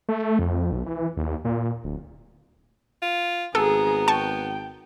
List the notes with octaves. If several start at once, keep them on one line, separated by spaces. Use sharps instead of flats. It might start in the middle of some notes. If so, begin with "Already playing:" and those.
A3
F2
B1
E3
D#2
A#2
D1
F4
G#1 B3 G#4 A4 A#5
G5 A5 C#6